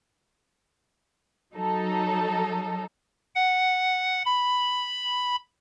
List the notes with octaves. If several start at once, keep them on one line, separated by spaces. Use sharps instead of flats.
F#3 D#4 A4
F#5
B5